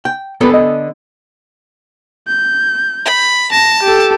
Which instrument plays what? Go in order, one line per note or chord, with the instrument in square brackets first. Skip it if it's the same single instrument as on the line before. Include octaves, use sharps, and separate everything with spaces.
[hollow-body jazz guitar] G5
[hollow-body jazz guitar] D3 B3 A4 [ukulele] G4 B4
[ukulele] D#5
[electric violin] G6
[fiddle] B5
[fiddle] A5 [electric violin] A#6
[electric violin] G4 A4